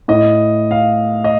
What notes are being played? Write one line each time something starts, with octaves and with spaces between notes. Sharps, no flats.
A2 D#5
F5
D#5